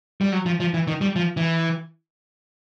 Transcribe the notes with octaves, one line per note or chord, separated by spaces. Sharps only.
G3
F#3
F3
F3
E3
D#3
G3
F3
E3